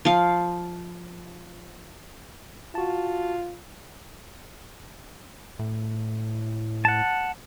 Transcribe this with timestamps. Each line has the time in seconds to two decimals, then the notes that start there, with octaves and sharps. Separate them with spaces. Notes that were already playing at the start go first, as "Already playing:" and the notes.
0.05 F3 F5
2.75 F4 F#4 A5
5.59 A2
6.85 F#5 A5